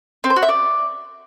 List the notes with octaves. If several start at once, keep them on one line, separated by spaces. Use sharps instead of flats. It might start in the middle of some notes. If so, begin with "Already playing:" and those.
C4
C5
F#4
E5
D5